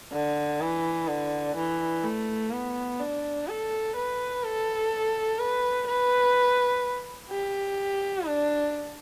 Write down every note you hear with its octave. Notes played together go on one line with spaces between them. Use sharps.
D3
E3
D3
E3
A3
B3
D4
A4
B4
A4
B4
B4
G4
D4